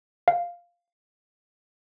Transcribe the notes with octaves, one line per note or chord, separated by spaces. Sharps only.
F5